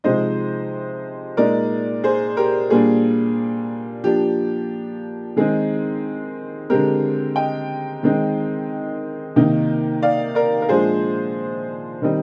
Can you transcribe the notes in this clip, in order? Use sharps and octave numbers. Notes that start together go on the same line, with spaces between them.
C3 F3 G#3 D#4 C5 D#5
A#2 G#3 D#4 A#4 D5
G#4 C5
G4 A#4
A#2 G3 A#3 D4 G#4
F3 A#3 D4 G4
D#3 G#3 C4 D#4 G#4
D3 G#3 C4 G4 A#4
D#5 G5
D#3 G#3 C4 D#4
C3 D#3 A#3 D#4
D5 F5
A#4 D5
A#4
A#2 F3 G#3 D4 G#4 C5
D#3 G3 C4 D#4